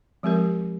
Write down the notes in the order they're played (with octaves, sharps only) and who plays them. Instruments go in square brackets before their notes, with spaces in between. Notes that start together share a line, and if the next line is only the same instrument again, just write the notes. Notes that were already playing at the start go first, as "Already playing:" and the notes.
[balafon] F3 G#3 C4 G4 A#4